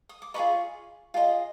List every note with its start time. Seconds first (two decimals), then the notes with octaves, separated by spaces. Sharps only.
0.09 D#6
0.22 D6
0.34 F4 G#4 B4 D#5 B5 C#6
1.14 F4 G#4 B4 D#5